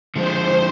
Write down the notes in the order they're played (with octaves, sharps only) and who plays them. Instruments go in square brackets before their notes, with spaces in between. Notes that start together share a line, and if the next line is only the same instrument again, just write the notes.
[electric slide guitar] D3 F3 G#3 [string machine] C5